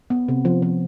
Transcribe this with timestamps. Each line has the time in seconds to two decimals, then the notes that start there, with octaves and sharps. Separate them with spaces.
0.10 B3
0.28 C3
0.45 F3
0.62 F3